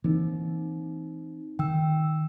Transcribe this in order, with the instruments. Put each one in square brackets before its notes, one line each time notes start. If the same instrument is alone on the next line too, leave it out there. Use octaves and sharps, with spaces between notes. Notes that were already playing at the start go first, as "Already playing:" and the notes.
[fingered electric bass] E3 A#3 [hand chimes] C4 D#4
[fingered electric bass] D#3 [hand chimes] G5 E6